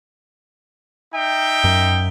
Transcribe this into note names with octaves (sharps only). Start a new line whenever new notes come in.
D#4 E5 G5
F#2